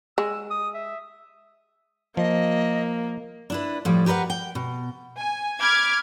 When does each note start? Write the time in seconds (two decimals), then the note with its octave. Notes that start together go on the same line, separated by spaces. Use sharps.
0.18 G#3 E6
0.50 D#6
0.74 E5
2.17 F3 A#3 D#5
3.50 D4 E4 B4
3.85 A2 F3 G3
4.06 G4 A#4 B4 D5 F#5
4.30 G5
4.55 B2
5.18 G#5
5.59 B5 D6 F6 G#6